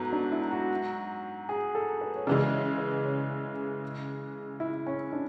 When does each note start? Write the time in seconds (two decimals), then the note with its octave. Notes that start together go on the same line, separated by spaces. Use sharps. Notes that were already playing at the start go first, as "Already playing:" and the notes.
Already playing: G#2 F#3 A3 B3
0.13 D4
0.32 E4
0.51 F#4
1.49 G#4
1.75 A4
2.01 B4
2.16 C#5
2.27 C#3 E3 G#3 D5
2.52 C#5
2.78 B4
3.04 C#5
4.60 E4
4.87 C#4
5.13 D4